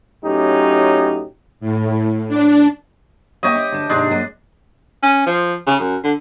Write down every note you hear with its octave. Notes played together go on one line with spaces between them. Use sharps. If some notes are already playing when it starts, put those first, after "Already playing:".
A2 F#3 C#4 D#4 G4
A2
D4
A#3 G4 C#5 D#5 E5
C4
D2 A5
D#2 G#2 C3 G#3 D4
F#2 A#3 D#5
C#4
F3
C#3
F#2
D3